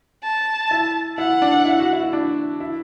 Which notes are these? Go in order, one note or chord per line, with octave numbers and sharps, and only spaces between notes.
A5
E4
E4 F#5
D4
E4
F#4
E4
E4
D4
E4